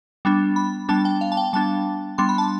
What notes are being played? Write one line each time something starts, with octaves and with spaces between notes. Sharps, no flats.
G3 B3 D4
B5
G3 B3 D4 A5
G5
F5
A5
G5
G3 B3 D4 A5
G3 B3 D4 C6
B5
A5